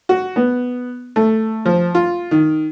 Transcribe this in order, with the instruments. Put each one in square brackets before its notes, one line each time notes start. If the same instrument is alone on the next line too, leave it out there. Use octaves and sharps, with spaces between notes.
[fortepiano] F#4
B3
A3
F3
F4
D#3